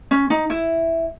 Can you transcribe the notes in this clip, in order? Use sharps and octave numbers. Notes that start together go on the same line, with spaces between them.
C#4
D#4
E4